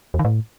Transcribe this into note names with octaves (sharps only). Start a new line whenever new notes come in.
E2
D#3
A2